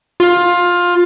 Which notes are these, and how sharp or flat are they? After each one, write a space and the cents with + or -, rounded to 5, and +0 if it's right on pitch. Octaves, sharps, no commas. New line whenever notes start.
F4 +15